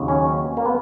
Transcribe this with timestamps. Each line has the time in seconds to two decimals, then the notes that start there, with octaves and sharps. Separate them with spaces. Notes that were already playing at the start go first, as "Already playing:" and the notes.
Already playing: D#2 C#3 F#3
0.08 C#4
0.57 A#3
0.66 B3